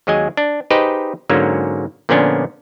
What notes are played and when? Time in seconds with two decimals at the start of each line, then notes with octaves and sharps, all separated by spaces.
0.07 D#2 F#3 G#3 G#4 D#5 G#5
0.37 D4
0.70 D#4 G4 G#4 B4 C5 D#5
1.30 G#2 D3 F#3 A#3 C#4
2.09 A#2 D3 F3 B3 C#4 D4